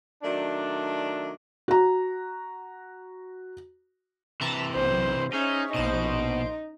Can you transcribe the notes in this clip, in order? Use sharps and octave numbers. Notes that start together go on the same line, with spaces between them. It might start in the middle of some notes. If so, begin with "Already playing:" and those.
D#3 F#3 A3 D4
F#4 A#5
C3 E3 E5 A5 A#5
B1 C5
C#4 D#4 G#4 C#5 E5
A#1 B2 D#4 C5 D7